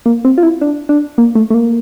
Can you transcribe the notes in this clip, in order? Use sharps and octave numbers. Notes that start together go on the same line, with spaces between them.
A#3
C4
F4
E4
D4
D4
A#3
A3
A3
A#3